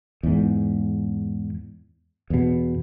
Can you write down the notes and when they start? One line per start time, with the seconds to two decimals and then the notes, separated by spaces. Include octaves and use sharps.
0.23 E2 G#2
2.30 E2 B2